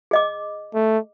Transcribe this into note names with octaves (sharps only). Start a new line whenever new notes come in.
G#4 D#5 D6
A3